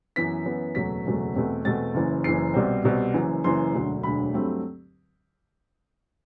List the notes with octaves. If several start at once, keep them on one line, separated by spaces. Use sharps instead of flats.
F#2 E3 B3 B6
F#2 E3 B3
F#1 E2 B2 F#3 A3 B6
F#1 E2 B2 F#3 A3
E2 B2 A3 C4
E2 B2 A3 C4 A6
F#1 F#2 E3
F#1 F#2 E3 C7
C2 B2 G3 C4
C2 B2 G3 C4
F#1 F#2 E3
F#1 F#2 E3 C6
E1 D2 D3 F#3
E1 D2 D3 F#3 B5
G2 F#3 A3 C4